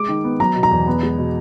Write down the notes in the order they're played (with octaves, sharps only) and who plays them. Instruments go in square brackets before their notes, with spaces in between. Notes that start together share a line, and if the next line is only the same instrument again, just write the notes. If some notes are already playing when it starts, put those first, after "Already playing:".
Already playing: [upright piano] G#3 D6
D#3
B3
F#3 A#5
B2
A#5
E2
B3
G#3
B2